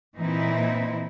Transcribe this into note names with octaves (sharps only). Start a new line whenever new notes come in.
A#2 E3 C4 D#4 E4